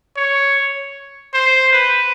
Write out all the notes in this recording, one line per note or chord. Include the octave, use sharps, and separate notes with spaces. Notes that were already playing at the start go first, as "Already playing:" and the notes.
C#5
C5
B4